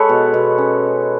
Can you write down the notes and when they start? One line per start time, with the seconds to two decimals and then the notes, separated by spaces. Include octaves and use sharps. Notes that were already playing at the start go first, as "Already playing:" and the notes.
Already playing: G#3 A4 B4 C#5
0.09 B2
0.34 B2
0.58 C#4